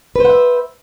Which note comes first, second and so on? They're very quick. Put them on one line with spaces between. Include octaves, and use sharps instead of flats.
B4 C5 F#5 E5